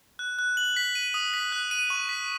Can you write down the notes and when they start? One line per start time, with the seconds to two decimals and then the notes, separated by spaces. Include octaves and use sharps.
0.19 F#6
0.39 F#6
0.57 F#7
0.77 B6
0.95 D#7
1.14 D#6
1.34 B6
1.52 F#6
1.71 D#7
1.90 C#6
2.09 B6